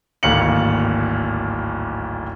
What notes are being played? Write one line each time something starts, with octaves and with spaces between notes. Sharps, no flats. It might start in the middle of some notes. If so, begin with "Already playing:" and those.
D1 G#1 D#2 F5 C#7 F#7